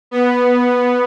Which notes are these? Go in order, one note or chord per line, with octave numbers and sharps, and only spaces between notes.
B3